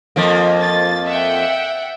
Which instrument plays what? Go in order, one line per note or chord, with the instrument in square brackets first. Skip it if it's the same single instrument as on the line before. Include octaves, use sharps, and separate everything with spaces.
[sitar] F2 F3 A#3
[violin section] A6
E5 F#5 G5